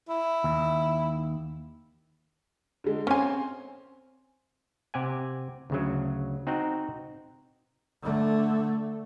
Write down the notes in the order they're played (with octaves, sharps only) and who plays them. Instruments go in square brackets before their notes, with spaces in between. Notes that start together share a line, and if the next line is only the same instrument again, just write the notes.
[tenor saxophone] E4
[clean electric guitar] D#2
[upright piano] D3 G#3
[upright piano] C4 C#5 C6 [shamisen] C#4 G#5
[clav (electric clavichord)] C3 G4 F#5 G#5
D2 C#3 F#3
C4 D#4 F#4 F#5 G5
[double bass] D3 A3